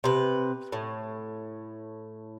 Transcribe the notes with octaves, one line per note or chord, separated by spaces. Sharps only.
C3 B4
A2